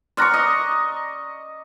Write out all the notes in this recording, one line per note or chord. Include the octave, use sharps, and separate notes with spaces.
D5 A#5 C6 C#6 F6 F#6
D#5